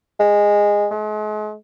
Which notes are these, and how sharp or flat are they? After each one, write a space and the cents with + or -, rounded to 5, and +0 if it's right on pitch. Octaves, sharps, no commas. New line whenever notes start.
G#3 -15
G#3 +40